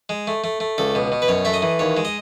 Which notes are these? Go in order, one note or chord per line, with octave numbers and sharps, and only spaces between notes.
G#3
A3
A3
A3
C#2 A4
B2
B2
B4
F#2 C#5
A3 E5
D#5
E3
D#2 C#5
G#3
D#5